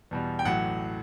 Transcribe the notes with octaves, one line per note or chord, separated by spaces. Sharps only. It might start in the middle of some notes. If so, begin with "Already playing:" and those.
E2 B2 G3
G5
A1 A2 F#3 F#5